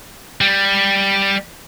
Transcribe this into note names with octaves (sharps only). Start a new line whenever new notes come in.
G3